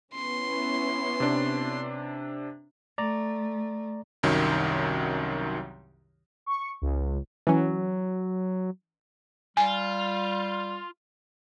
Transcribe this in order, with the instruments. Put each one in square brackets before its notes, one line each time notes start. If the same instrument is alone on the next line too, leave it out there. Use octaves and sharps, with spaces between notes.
[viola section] B3 C#4 E4 [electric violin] C6
[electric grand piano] C3 D4
[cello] A3 [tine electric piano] D5 A#5
[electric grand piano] C2 F#2 D#3 F#3
[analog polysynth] C#6
C#2
[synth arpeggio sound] E3 C#4 [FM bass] F#3
[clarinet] G3 [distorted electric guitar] F4 [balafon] G#5